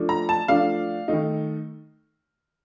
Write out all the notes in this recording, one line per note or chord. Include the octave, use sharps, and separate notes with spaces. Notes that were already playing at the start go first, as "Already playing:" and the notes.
Already playing: F3 A3 D4
A#5
A5
F3 A3 D4 F5
D#3 A3 D#4